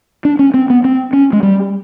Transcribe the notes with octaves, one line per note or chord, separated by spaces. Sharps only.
D4
C#4
C4
B3
C4
C#4
G#3
G3